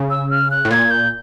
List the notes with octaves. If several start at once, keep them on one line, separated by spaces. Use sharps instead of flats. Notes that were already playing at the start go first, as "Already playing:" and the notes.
Already playing: C#3
E6
F6
F#6
A2
A#2 G#6
G6